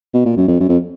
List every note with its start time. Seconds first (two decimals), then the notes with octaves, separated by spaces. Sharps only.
0.13 B2
0.25 A#2
0.37 F#2
0.48 F2
0.60 F#2
0.69 F2